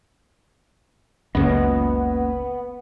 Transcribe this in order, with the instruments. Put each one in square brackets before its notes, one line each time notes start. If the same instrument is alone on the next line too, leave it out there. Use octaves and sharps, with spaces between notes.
[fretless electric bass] F#1 C#2 [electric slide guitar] A#3 C#4 D#5 [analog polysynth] B3